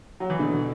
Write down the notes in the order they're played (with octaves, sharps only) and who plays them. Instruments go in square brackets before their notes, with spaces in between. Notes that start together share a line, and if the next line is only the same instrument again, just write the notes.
[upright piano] F#3
E3
B2 D3